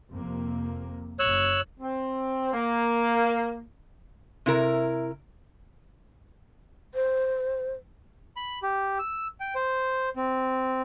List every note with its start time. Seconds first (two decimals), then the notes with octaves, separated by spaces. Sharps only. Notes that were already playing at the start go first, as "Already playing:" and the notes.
0.11 F2 C3 A#3
1.19 F#1 C#5 E6 F#6
1.80 C4
2.53 A#3
4.46 C3 E4 A#4
6.95 C5
8.37 B5
8.63 G4
8.99 E6
9.40 G5
9.55 C5
10.16 C4